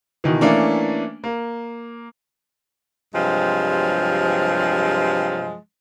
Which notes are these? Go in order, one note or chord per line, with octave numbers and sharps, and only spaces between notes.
B2 D#3 E3
E3 A3 A#3 C#4 D4
A#3
G2 C3 F3 F#3 G#3